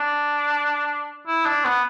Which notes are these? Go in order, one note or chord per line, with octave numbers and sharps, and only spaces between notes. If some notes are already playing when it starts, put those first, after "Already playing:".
Already playing: D4
E4
D4
B3